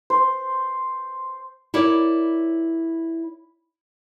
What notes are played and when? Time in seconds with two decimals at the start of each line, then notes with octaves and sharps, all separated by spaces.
0.10 C5
1.74 E4 A#4 C#5 D5